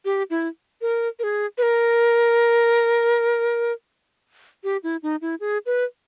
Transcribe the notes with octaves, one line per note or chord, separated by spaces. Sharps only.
G4
E4
A#4
A#4
G#4
B4
A#4
G4
E4
D#4
E4
G#4
B4